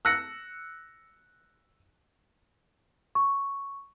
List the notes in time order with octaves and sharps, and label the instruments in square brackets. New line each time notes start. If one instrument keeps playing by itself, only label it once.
[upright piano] E6 F#6 A#6 C#7
[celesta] C#6